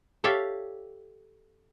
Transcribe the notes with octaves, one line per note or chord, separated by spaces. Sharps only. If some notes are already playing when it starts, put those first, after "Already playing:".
G4 A4 C#5 D5 E5 F5